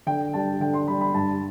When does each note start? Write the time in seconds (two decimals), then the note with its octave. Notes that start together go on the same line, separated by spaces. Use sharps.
0.06 D3 G5
0.33 G3 D4 A5
0.60 D3 G5
0.74 C6
0.88 G3 D4 B5
1.01 B5
1.14 G2 A5